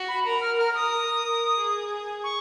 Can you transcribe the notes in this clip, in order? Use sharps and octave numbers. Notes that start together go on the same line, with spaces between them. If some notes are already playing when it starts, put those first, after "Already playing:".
Already playing: F#4
B5
A#4 A#5
F6
A#4 F6
D#6
A#4
G#4
C#6